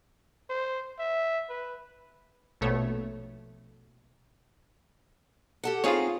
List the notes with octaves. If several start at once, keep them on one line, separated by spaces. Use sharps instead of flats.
C5
E5
B4
A#1 B2 A3 C#5
G4 A4 F#5
C4 D#4 F4 G#4 C#5 F5